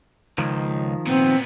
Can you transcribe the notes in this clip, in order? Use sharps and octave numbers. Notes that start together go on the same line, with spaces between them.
C#2 D#3 F3
A#2 B3 C4